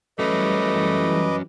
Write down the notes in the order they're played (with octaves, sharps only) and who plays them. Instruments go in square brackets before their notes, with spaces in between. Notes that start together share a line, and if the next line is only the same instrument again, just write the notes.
[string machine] E3 G3 [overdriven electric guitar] F#3 C#4 [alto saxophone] A3 [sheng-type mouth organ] B4 D#5 D6